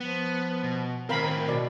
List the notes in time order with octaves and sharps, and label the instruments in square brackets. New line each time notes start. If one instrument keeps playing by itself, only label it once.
[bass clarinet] F3 [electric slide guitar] B3
[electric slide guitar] B2
[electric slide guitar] A2 C4 [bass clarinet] D#3 [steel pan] A#4 F5 B5
[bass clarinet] B2 [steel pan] D5